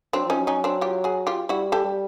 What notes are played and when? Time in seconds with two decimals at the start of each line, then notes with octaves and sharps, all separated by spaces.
0.13 F#3 C4 D4
0.26 F3 C#4 D#4
0.39 F#3
0.47 C#4 D#4
0.64 C4 D4
0.81 F4 G4
1.04 F#4 G#4
1.27 F4 G4
1.49 G3 E4 F#4
1.72 G4 A4
1.84 G3